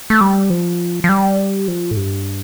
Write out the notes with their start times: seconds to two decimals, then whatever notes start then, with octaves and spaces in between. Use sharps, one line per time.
0.10 A3
0.21 G3
0.50 F3
1.04 F3
1.09 G3
1.68 F3
1.91 A2
1.97 G2